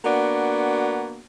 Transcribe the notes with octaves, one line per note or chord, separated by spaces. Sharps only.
A#3 B3 D4 F#4